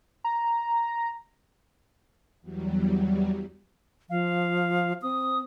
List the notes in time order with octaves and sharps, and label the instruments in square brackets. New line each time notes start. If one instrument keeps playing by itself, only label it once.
[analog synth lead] A#5
[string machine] E2 F#3 G3
[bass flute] F3 [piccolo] F5
[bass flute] C4 [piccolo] D#6